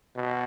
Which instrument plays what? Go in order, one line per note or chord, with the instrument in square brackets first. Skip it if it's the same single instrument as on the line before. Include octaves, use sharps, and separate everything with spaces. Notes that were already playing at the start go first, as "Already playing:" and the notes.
[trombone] B2